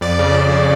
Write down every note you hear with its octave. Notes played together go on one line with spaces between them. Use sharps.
F2 D5
C#3
F2
C#3